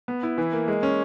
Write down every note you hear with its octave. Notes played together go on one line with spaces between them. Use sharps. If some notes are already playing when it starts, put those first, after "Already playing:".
B3
E4
E3
A#3
G#3
C#4